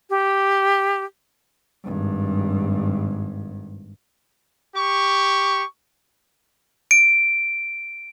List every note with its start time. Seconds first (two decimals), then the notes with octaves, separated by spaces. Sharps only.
0.10 G4
1.84 G#1 G2
4.76 G4 C#6
6.91 D7